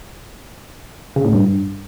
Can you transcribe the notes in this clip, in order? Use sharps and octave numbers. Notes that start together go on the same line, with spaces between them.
C#3
A2
G2